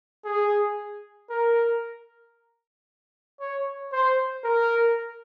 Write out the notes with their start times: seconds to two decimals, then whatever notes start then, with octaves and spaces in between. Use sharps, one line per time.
0.25 G#4
1.30 A#4
3.40 C#5
3.92 C5
4.44 A#4